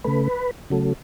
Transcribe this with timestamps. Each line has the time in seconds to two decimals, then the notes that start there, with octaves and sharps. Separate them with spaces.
0.04 C#3 A3 B4
0.70 C#3 F#3 A3